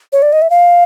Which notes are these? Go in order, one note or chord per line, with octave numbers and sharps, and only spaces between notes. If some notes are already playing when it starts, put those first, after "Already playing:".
C#5
D5
D#5
E5
F5